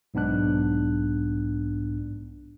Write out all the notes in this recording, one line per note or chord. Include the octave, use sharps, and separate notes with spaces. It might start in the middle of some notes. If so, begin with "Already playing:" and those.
B1 G#2 B3 D4 F#6